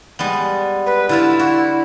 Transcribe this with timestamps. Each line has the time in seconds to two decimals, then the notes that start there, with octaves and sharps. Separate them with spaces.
0.19 G3 G#3 B3
0.86 B4
1.09 D3 E4 F4 A4
1.39 F#4